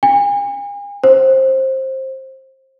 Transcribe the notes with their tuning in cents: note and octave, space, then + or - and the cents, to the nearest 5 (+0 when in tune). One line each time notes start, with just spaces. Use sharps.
G#5 -45
C5 +20